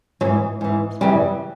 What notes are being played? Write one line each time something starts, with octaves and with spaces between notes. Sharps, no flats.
G#2 E3 F#3
G#2 E3
F#2 C#3 E3 G3